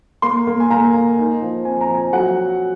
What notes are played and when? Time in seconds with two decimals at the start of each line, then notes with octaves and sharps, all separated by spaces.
0.22 A#3 C6
0.47 A#3
0.60 G#5
0.70 A#3 A#5
0.94 A#3
1.18 D#4
1.42 F3
1.65 C4 G#5
1.81 A#5
1.89 F3
1.97 G#5
2.13 F#3 F#5